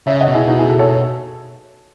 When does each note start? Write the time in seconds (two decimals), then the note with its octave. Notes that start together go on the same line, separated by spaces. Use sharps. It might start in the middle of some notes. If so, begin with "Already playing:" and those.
0.07 C#3 C#5 E5
0.21 D#5 F#5
0.28 B2
0.35 E4 G#4
0.48 D#4 F#4
0.59 E4 G#4
0.69 F#4 A4
0.79 A4 C#5